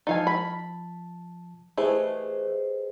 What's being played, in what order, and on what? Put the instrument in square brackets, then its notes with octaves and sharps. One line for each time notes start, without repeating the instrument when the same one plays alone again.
[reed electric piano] F3 A5 [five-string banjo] D#4 F5 G#5
[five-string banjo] B5
[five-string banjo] E3 A3 [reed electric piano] G4 B4 D#5 [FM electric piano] G#4 C5